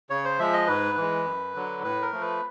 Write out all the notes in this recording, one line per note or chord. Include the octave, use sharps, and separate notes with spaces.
C#3 C#5
C5
F3 G#3 E5
D#5
G#2 B4
E3 G#3
F#2
D3 F#3
A2 B4
A#4
F3 A3
B4